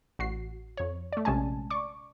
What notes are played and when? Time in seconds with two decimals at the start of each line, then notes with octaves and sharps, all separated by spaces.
0.19 A1 F#4 C7
0.77 F2 C#5
1.12 A3 D5
1.25 A#1 C3 G#3 C#4 G#5 A5
1.70 D5 C#6 D6